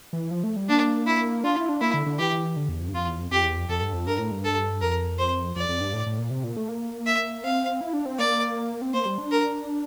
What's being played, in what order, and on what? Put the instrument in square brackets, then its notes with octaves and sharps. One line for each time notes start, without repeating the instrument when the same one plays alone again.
[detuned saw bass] E3
F3
A3
G3
[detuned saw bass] A#3 [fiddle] D4
[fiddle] E4
[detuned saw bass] D4 [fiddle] F4
[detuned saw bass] E4
D4
[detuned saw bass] A#3 [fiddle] E4
[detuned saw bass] D3
D3
[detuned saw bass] E3 [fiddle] G4
[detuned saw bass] D3
E2
F2
G2
[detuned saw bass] F2 [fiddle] F4
[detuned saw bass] E2
F2
[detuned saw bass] F2 [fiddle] G4
[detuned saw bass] E2
F2
[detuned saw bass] F2 [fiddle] A4
[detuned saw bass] G2
F2
[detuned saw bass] G2 [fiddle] A#4
[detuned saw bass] A2
G2
[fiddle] A4
[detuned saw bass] F2 [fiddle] A#4
[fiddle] C5
[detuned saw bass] F2 [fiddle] D5
[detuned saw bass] F2
G2
A2
A2
A#2
C3
A#2
A3
A#3
[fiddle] E5
[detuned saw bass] C4 [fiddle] F5
[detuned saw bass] E4
D4
C4
[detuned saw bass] A#3 [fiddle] D5
[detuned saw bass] C4
[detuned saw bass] A#3 [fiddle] C5
[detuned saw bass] G3
D4
[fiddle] A#4